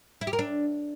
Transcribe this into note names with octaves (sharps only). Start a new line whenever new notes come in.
E4
G4
A#4
D4